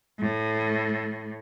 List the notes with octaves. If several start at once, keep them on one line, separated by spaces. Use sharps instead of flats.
A2